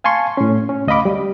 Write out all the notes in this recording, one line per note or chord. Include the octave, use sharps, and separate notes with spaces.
F5 G#5 A5 C6 C#6
A2 C#4
C#4
D2 D#5 F5 B5 D6
G3